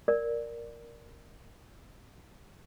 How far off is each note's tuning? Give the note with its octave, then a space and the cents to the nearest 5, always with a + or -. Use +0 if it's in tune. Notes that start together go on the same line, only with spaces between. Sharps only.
A#4 +0 D5 +0